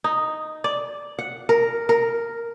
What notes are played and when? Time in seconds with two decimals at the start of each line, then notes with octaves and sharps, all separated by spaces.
0.04 D#4
0.64 D5
1.19 F#5
1.49 A#4
1.89 A#4